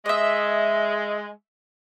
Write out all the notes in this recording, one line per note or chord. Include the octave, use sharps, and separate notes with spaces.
G#3 D#5 E5